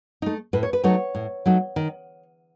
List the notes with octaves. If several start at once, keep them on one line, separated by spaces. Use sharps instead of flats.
A3 D#4
A2 B4
C#5
B4
F#3 A3 D#4 C#5
A2
F#3 A3 D#4
D#3